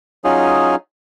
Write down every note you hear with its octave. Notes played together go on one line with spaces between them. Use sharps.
F#3 C#4 D#4 F4 G#4